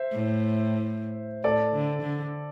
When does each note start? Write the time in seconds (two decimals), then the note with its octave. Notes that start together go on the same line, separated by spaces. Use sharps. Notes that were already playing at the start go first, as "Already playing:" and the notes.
Already playing: C5 E5
0.12 A2
1.43 A2 A4 D5
1.73 D3
2.02 D3